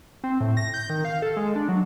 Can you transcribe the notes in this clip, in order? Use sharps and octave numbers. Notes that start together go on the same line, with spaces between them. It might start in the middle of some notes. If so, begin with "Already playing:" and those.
C4
A2
A#6
G6
D#3
F5
A4
G#3
D4
F#3